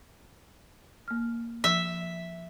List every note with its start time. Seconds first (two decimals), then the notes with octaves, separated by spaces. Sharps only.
1.08 A#3 F6
1.64 F3 E5